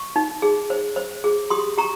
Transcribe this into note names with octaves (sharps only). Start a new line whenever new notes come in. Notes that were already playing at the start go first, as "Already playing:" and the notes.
Already playing: C#6
D#4
G#4
C5
C5
G#4
G4 C6 D#6
G4 A#5 C#6